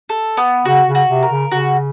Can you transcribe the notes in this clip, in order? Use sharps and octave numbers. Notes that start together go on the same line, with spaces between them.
A4
B3
C#3 F#4
C#3
F#4
C3
A#4
C#3
C#3 F#4